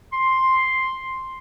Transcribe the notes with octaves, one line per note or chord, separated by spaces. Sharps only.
C6